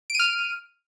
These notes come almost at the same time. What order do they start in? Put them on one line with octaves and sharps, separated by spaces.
D7 D#7 F6